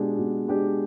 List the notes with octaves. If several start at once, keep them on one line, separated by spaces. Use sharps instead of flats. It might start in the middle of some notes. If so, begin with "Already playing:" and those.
Already playing: B2 G#3 D4 G4
B2
G#3 D4 G4